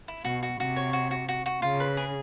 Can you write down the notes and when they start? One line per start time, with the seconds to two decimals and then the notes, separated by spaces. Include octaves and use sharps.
0.08 E4
0.25 B2 F#4
0.43 F#4
0.59 C3 F#4
0.76 C#5
0.93 F#4
1.11 F#4
1.28 F#4
1.46 F#4
1.62 C#3 F4
1.80 B4
1.97 G#4